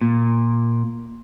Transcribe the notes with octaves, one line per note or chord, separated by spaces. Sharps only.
A#2